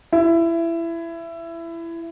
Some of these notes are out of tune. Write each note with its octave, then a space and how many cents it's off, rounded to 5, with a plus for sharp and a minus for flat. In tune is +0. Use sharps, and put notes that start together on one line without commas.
E4 +20